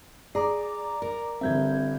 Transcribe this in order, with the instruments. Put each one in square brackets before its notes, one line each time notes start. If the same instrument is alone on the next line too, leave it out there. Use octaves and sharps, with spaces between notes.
[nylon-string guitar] G#4 [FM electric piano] D5 A#5 D6
[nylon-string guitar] A#4
[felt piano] G1 G3 E5 [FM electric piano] C4 G6 G#6